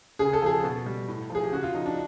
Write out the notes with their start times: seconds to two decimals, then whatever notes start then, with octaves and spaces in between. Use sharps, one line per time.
0.19 C#3 G#4
0.33 A4
0.42 F3 G#4
0.64 B2
0.86 G3
1.08 A2
1.30 F3 G#4
1.44 G4
1.52 C#3 F#4
1.63 F4
1.74 F3 D#4
1.86 D4